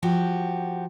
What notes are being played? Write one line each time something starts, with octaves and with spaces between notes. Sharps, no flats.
F3 F#4 G4